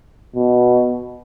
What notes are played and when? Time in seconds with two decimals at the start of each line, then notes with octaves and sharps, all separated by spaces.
0.36 B2